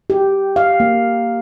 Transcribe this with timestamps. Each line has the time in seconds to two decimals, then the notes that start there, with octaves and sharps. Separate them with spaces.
0.10 G4
0.56 F5
0.80 A#3